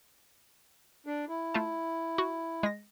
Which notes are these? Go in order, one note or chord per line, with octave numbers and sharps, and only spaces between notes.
D4
E4
A3 F4 A5
F#4
G#3 A#6